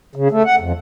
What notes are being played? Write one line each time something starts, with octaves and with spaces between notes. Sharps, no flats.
C#3
A3
F#5
F2